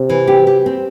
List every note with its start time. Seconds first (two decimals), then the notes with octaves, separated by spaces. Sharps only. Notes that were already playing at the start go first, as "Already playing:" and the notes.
Already playing: C3
0.09 E3
0.27 G4
0.47 G4
0.66 C4